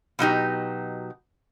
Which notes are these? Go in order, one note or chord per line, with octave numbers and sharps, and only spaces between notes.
B2 F#3 D#4 G4